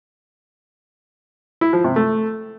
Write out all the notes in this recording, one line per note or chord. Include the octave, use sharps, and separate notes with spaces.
E4
F3
C3
A3